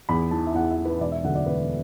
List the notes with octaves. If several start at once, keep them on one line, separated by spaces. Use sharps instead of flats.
E2 B5
E3 A5
E5
E2 F#5
E5
E3
B4
E1 D5
E5
D2 D3 F#3 F#5
D5
E1 B4